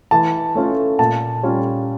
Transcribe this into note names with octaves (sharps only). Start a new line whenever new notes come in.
E3 A5
A3 C#4 F4
A#2 A5
G3 C#4 F4